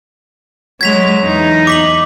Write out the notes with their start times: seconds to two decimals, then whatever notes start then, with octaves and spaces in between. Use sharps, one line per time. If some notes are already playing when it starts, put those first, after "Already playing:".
0.81 F#3 G#3 G#6 B6 F7
1.24 E2 D#4
1.67 D6 B6 F#7